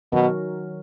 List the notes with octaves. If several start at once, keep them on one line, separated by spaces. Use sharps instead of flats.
B2 D#3 F#3 C#4 F#4 A#4